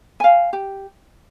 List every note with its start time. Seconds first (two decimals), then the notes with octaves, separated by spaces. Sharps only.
0.20 F5 G#5
0.53 G4